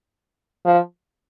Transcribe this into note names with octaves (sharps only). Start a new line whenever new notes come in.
F3